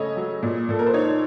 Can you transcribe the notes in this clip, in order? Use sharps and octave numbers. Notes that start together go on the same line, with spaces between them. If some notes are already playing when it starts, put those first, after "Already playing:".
Already playing: C#3 A3 C#5 D#5
F#3
A#2
A#2 A4
A#4
C5
D#4 C#5